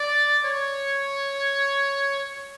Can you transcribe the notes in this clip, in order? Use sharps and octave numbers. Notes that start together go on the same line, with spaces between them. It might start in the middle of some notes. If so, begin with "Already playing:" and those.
Already playing: D5
C#5